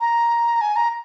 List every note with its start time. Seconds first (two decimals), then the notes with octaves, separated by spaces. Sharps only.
0.01 A#5
0.61 G#5
0.76 A#5